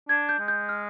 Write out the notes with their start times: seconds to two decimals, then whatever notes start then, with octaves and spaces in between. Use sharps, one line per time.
0.09 D4 G#6
0.29 G6
0.39 G#3
0.48 G6
0.69 F6